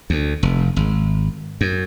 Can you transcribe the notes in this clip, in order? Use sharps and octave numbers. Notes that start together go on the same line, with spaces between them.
D2
F1
G#1
F#2